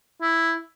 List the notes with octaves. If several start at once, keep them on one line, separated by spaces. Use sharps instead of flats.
E4